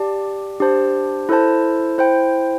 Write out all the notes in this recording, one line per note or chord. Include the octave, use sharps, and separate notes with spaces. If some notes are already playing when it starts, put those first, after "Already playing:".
Already playing: G4 D5 A5
D4 G4 C5 A5
E4 A4 C5 A5
E4 C5 G5